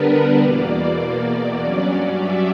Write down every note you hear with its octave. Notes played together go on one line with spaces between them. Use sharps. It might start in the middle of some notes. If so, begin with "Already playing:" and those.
Already playing: D3 G3 B3 D4 A#4 B4
E2 B2 A#3 D5
G2 F#3 C#4 D5
D5
E5